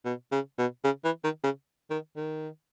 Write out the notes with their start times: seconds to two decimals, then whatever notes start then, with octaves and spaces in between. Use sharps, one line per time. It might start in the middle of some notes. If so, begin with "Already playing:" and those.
0.05 B2
0.32 C#3
0.58 B2
0.84 C#3
1.04 E3
1.24 D#3
1.43 C#3
1.90 D#3
2.17 D#3